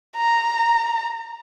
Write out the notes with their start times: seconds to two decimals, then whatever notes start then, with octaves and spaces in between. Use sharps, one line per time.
0.17 A#5